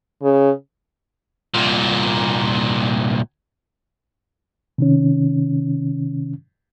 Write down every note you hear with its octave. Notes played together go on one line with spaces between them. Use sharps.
C#3
C2 A#2
C3 D#3 C#4